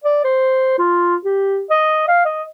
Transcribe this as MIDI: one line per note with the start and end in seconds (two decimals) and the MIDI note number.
0.04 0.20 74
0.24 0.78 72
0.79 1.16 65
1.25 1.62 67
1.70 2.05 75
2.08 2.23 77
2.25 2.44 75